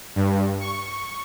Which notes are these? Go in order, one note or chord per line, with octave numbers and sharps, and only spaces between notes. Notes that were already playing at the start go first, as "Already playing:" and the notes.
G2
C#6